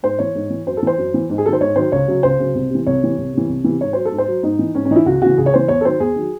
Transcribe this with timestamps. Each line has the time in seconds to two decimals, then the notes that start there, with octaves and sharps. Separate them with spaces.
0.03 G#2 C5
0.19 E3 C#5
0.35 G#2
0.50 E3
0.66 F#2 C5
0.77 A4
0.83 E3 C5
0.98 F#2
1.14 E3
1.30 G#2
1.38 G#4
1.45 F#3 A4
1.48 D#3 C5
1.61 G#2 C#5
1.76 D#3 F#3 C5
1.92 C#2 C#5
2.08 C#3 F#3
2.23 C#2 C5
2.39 C#3 F#3
2.55 C2
2.70 C3 E3
2.86 C2 C#5
3.02 C3 E3
3.18 C2
3.34 C3 E3
3.49 C2
3.64 C3 E3
3.81 G#2 C#5
3.93 F#3 C5
4.05 A4
4.12 G#2
4.18 C5
4.28 F#3
4.43 G#2 D#4
4.59 E3
4.75 G#2 C#4
4.85 C#4
4.91 E3 D#4
4.96 E4
5.06 C#2 F#4
5.22 C#3 E3 F#4
5.38 C#2 G#4
5.46 C#5
5.54 C#3 E3 C5
5.68 E2 C#5
5.81 A4
5.85 D#3 F#3 C5
6.00 E2 G#4
6.16 D#3 F#3